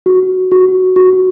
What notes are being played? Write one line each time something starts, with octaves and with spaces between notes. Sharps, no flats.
F#4
F#4
F#4